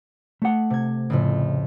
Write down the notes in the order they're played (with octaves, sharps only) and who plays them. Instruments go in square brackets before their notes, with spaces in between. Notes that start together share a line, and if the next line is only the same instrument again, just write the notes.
[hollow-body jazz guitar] A3 F#5
[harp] C3 G#6
F2 A2 C#3